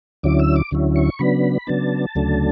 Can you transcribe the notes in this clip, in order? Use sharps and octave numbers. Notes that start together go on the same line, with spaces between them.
D2 D3 F#3 C#4 E4 D6
E6
D6
D2 D3 F#3 C#4 E4
C#6
C#3 F#3 B3 D4 B5
C#3 F#3 B3 D4 A5
D2 C#3 F#3 A3 D4